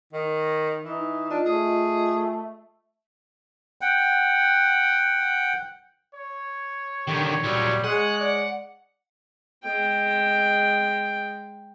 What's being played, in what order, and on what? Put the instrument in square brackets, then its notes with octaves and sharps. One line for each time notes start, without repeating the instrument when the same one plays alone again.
[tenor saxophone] D#3
[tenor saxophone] E3 [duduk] D#4
[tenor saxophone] D4 [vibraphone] F4 D#5
[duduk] A3 [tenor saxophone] G#4
[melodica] F#5 G5
[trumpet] C#5
[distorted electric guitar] D3 D#3 [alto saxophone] G4
[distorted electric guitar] A#2 F#3 [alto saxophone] G3
[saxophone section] G#3 [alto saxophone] G#4 [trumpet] C#5 [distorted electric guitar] F#5
[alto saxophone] D5
[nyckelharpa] G#3 G5